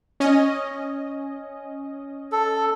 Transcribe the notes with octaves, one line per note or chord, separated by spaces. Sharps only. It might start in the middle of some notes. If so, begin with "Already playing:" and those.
C#4 D#5
A4